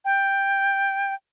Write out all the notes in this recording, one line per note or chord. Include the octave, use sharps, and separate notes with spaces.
G5